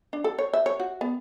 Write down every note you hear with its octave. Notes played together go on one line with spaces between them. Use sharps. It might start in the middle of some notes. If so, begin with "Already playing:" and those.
D4
A4
C#5
E5
C#5
F#4
B3